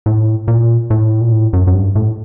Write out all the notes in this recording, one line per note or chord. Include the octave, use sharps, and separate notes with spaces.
A2
A#2
A2
A#2
A2
F#2
F#2
G2
A2